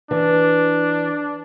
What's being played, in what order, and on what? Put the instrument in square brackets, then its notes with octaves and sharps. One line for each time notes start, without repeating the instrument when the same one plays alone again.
[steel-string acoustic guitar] E3 [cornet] D4